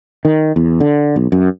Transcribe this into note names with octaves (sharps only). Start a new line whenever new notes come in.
D#3
E2
D3
B1
F#2